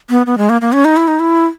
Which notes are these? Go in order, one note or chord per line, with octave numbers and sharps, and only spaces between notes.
B3
B3
G#3
A#3
A#3
C#4
D#4
E4
D#4
E4